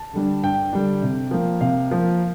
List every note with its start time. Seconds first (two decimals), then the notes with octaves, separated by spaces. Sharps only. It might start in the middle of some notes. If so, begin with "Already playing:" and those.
Already playing: A5
0.13 D3 G3 D4
0.43 G2 G5
0.73 D3 G3 D4
1.02 C3
1.31 F3 A#3
1.61 C3 F5
1.91 F3 A#3